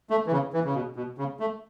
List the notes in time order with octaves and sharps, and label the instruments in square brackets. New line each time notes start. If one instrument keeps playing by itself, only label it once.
[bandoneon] A3
E3
C#3
E3
C#3
B2
B2
C#3
A3